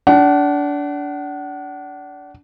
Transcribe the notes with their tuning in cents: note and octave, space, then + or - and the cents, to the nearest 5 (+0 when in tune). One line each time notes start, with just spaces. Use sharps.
D4 -25 F#5 +30